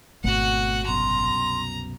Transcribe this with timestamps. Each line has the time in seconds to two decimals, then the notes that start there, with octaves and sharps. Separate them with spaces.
0.24 G#1 B2 A3 C4 F#4 F#5
0.86 C2 F#2 B2 A#5 C6